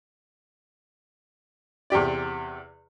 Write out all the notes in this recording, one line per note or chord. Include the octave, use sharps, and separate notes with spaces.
E2 C3 G4 D5